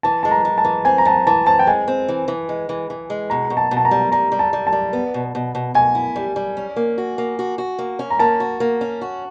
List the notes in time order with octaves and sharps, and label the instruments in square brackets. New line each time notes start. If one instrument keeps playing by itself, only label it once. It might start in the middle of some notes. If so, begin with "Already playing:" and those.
[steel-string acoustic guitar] E3 [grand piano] A5
[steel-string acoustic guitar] G#3 [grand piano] A5
[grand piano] A#5
[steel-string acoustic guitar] G#3
[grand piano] A5
[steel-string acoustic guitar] E3
[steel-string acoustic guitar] C4 [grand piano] G#5
[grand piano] A#5
[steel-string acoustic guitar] E3 [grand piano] A5
[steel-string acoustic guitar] E3 [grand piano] A5
[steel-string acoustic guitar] C4 [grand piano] A5
[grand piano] G5
[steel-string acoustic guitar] G#3 [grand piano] G#5
[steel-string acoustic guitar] C4
E3
E3
G#3
E3
E3
G#3
[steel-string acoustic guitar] B2 [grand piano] A#5
[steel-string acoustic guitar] B2
[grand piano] A5
[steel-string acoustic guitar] B2
[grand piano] A5
A#5
[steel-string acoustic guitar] G3
[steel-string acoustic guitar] G3 [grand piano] A#5
[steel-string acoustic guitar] G3
[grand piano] A5
[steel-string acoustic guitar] G3
[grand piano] A5
[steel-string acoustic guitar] G3
B3
B2
B2
B2
[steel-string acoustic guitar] B2 [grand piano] G#5
[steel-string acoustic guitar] E4
G3
G3
C#4
A#3
F#4
A#3
F#4
F#4
A#3
C#4
[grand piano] A#5
[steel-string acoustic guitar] A#3 [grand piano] A5
[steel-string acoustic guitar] F#4
A#3
C#4
F#4